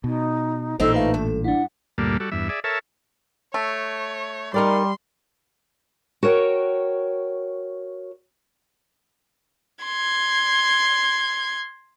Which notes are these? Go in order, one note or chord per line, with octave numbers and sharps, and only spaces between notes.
B2 D#4
A1 A#2 C4 D4 D#4 A4
A3 B4 F5
G2 A4
D4 E4 F#5
D2 G2 A#2 G3 A#3 A4
G3 F#4 A4
E2 G2 E5
G#4 D5 E5
A4 A#4 C#5 E5 A5
A3 C#5
G3 D#4 A#4 D5 C6
F#4 A#4 C#5 G5
C6 G#6